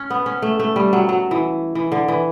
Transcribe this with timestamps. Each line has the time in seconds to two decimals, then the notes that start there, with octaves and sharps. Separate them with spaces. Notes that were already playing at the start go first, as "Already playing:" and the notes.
Already playing: C#4
0.10 B3
0.26 C#4
0.42 A3
0.59 A3
0.76 G3
0.93 F#3
1.09 F#3
1.31 E3
1.75 E3
1.92 D3
2.08 E3